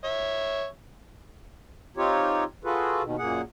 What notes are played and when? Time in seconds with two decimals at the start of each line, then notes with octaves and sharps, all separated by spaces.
0.04 C#5 E5
1.97 C4 D#4 F4 G4 C#5
2.64 F4 F#4 G#4 A4 B4
3.03 D#2 B2 D#3
3.18 F#2 A#2 A#3 G#4 F#5